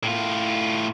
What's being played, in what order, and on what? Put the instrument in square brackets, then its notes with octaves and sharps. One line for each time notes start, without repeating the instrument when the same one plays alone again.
[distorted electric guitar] A2 F4